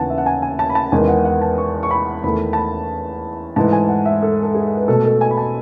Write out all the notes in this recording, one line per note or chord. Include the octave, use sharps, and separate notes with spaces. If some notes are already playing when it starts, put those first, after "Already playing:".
Already playing: D#2 C#3 E3 B3 F#5 G#5 A5
E5
F#5
G#5
G#5
A5
B5
A5
E2 D#3 G#3 B3 G#5
F#5
F#5
A5
C#6
C#6
B5
E2 D#3 A3 B5
A5
B5
G#2 E3 A3 A5
G#5
F#5
E5
A4
A4
G#4
B4
B2 A3 A4
A4
G#5
B5
A5